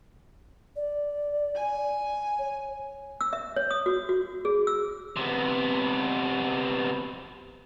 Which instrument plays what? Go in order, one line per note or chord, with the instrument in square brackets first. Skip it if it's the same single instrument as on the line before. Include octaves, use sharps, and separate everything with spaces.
[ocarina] D5
[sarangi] G#5
[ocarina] C#5
[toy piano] E6
E5
C#5
D#6
F#4
F#4
G#4
E6
[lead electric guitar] C3 B3